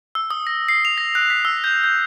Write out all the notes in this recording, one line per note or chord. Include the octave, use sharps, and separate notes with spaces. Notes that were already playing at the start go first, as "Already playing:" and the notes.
E6
D#6
A#6
C7
F7
A#6
F#6
B6
E6
G6
G6